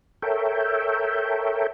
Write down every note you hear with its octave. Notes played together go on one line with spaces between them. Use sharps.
A4 A#4 C#5 E5 G5